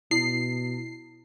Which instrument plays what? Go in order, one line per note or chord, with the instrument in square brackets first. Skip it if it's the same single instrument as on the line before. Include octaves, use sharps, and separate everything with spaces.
[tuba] B2 [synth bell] E4 [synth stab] C7